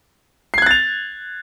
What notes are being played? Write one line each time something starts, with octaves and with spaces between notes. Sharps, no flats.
F#6 G#6 A6 C7 F7